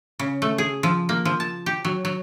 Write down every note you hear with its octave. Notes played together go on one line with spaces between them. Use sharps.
C#3
A3
G#4
F3
A#3
F3
A5
G4
F#3
F#3